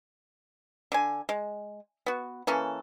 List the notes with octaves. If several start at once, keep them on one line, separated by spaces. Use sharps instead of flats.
D3 G#5
G#3
B3 F#4
E3 A#3 C#4 A4